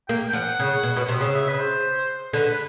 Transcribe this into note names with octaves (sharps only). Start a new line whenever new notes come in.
A#3 G5
G5
F3 F#5
C#3
B2
B2
C3
C#3
E5
B4
C5
D3 B4